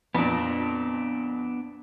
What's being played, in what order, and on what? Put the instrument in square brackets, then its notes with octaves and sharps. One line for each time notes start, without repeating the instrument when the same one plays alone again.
[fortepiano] F2 A#2 [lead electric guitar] B3 D4